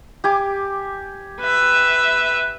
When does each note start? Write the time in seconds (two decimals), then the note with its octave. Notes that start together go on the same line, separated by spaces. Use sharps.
0.24 G4 G#5 D6
1.40 B4 E5